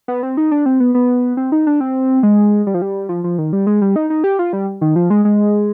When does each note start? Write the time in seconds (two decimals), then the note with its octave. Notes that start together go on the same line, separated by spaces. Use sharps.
0.08 B3
0.23 C4
0.37 D#4
0.51 D4
0.66 C4
0.80 B3
0.95 B3
1.37 C4
1.52 D#4
1.67 D4
1.80 C4
2.23 G#3
2.67 G3
2.74 F3
2.82 G3
3.09 F3
3.24 F3
3.38 D#3
3.53 G3
3.67 G#3
3.81 G3
3.96 D#4
4.10 D#4
4.24 G4
4.39 F4
4.53 G3
4.81 D#3
4.96 F3
5.10 G#3
5.25 G#3